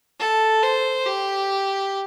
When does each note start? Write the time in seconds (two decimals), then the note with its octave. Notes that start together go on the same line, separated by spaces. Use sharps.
0.19 A4
0.63 C5
1.06 G4